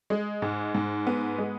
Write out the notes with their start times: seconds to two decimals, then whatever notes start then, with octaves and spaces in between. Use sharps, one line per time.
0.10 G#3
0.42 G#2
0.74 G#2
1.07 B3
1.38 G#3